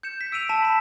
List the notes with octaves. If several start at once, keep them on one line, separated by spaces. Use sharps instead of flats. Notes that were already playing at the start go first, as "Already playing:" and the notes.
G6 C#7 E7
B6
E6 D7 D#7 F7
A5 B6 E7
B5 B6